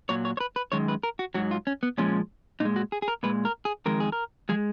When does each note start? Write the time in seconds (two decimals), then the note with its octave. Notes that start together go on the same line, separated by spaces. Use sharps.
0.09 A#2 F#3 C#5
0.25 C#5
0.37 C#5
0.40 B4
0.56 B4
0.72 F#2 D#3 G#3 C#5
0.88 B4
1.03 A#4
1.19 F#4
1.34 G#2 F#3 F#4
1.51 F4
1.67 C#4
1.83 B3
1.98 A#2 F3 G#3 C#4
2.60 A#2 G#3 D#4
2.76 F#4
2.92 G#4
3.02 G#4
3.08 A#4
3.23 A#2 G#3 B4
3.45 A#4
3.65 G#4
3.86 F2 D#3 G#3 A#4
4.00 G#4
4.12 A#4
4.49 F3 G#3 G#4